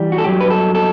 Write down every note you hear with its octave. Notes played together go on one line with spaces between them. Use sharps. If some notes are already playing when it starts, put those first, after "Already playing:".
Already playing: E3 G3
F#4
A4
G2 F#3 G4
B4
A4
A4